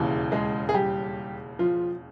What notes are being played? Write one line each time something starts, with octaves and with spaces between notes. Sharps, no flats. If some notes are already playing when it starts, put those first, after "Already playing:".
Already playing: E1 D#2 C#3 E3
G#3 G#4
G#4
G3 G4
F3 F4